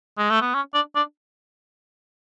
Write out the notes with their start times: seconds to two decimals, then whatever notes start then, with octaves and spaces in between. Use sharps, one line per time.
0.18 G#3
0.30 A3
0.41 B3
0.54 C#4
0.74 D4
0.96 D4